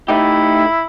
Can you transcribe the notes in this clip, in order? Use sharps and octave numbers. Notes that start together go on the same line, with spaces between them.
A3 D#4 E4 G4